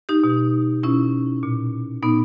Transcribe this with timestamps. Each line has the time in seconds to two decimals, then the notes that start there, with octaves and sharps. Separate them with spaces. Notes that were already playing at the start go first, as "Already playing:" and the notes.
0.09 D#4 G4
0.24 B2
0.83 B2 C#4 E4
1.43 A#2
2.03 A#2 B3 D#4